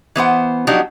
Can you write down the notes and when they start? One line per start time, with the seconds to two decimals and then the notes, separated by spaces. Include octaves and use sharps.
0.16 E3 B3 C5 F#5
0.67 F3 F#3 D4 D#4 F#4 G4